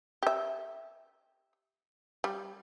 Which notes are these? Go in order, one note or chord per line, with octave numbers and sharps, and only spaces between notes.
G4 E5
G3